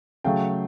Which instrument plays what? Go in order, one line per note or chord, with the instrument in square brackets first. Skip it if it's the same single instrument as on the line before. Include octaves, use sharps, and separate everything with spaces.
[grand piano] C#3 F#3 A3 F5 G5